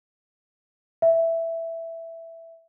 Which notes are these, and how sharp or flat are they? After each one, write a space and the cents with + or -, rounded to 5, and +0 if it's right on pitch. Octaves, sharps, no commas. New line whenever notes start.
E5 +5